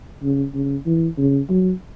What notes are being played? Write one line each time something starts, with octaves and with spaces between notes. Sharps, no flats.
C#3
C#3
E3
C#3
F#3